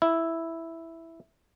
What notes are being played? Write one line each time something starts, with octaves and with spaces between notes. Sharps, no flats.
E4